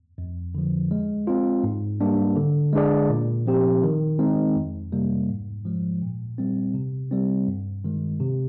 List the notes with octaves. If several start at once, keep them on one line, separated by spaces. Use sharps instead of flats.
F2
D3 F3
G#3
C4 F4
G#2
G3 A#3 D4
D3
G#3 D4 G#4 D5
A#2
F3 C4 G4
D#3
G#3 C4 D#4
F2
C3 G3 A#3
G#2
F3 G#3
A#2
G3 C4
C3
G3 C4
G2
D#3 G#3
C3